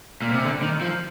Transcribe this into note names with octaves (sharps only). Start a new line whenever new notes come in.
A#2
C3
D3
D#3
F3